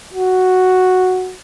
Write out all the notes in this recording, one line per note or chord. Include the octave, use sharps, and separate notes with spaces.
F#4